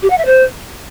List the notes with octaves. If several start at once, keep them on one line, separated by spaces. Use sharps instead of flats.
G4
F#5
E5
C5